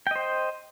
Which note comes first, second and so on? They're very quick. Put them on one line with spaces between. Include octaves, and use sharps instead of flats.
G5 D#5 C5